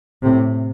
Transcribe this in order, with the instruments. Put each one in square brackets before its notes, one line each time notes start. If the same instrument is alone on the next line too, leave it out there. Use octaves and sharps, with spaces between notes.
[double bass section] A2 C3